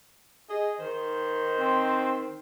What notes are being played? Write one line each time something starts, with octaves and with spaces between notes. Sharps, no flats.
G#4 D#5
D#3 C5
C4